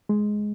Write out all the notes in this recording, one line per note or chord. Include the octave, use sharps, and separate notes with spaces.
G#3